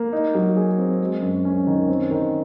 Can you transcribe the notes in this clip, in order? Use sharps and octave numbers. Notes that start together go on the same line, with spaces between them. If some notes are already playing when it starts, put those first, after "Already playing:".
Already playing: A#3
D#4
F#3
G#4
C4
G#3
F#2
C#4
D#3
C4
D#3